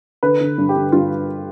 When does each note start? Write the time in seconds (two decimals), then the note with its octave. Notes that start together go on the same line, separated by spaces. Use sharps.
0.23 D3 B4
0.41 D3
0.58 G2
0.69 G4
0.76 D3
0.92 G2 F4